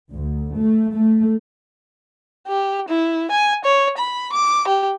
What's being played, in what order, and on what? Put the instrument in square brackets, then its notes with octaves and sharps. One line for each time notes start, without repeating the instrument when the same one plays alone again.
[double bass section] D2
A3
A3
[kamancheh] G4
E4
G#5
C#5
B5
D6
G4